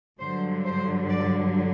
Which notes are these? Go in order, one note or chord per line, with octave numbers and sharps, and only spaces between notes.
G2 D3 F#3 C5
C5
D5